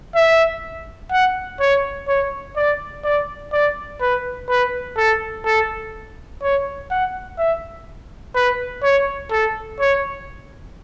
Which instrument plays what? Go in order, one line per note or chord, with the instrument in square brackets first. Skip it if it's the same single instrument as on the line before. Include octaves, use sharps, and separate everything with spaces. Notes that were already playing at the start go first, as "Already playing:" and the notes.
[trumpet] E5
F#5
C#5
C#5
D5
D5
D5
B4
B4
A4
A4
C#5
F#5
E5
B4
C#5
A4
C#5